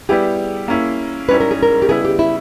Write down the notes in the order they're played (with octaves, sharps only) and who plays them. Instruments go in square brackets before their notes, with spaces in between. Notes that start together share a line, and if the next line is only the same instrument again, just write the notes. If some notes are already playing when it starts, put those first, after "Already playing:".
[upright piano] G3 B3 E4 G4 [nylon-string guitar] G#4
[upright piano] A#3 C#4 E4
[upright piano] G#2 G3 C#4 E4 [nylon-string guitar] B4
[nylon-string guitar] A#4
G#4
A#4
G4
[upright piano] C#3 G3 B3 E4 [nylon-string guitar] G#4
[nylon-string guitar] G4
E4